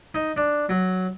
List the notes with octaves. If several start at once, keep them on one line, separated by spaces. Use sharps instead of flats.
D#4
D4
F#3